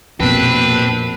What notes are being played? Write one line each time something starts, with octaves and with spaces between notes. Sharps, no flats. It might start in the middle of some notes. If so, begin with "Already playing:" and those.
A#1 F2 B2 C4 D4 B4